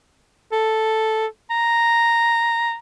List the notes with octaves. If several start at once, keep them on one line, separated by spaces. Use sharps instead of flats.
A4
A#5